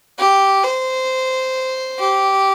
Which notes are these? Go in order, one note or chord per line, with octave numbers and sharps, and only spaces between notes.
G4
C5
G4